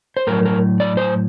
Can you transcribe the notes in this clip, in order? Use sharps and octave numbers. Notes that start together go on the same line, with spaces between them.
C5
A2 F#3 A#4
A#4
D5
C5